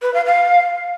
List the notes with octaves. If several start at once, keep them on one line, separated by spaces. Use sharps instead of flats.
B4
F5
F5